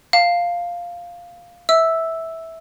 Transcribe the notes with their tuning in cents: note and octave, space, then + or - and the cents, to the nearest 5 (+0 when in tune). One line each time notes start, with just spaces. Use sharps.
F5 +0 A5 +20
E5 -15 E6 +0